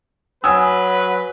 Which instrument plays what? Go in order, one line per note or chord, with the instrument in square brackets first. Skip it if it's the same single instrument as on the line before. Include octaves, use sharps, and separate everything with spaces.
[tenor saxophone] F#3 [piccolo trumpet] B4 [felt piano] G#5 D#6 E6